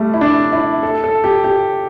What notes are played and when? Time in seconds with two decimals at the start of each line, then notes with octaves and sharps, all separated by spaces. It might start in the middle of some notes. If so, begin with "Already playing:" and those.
Already playing: G3 A3
0.14 E4
0.21 D4
0.52 E4
0.83 A4
1.04 A4
1.24 G4
1.44 G4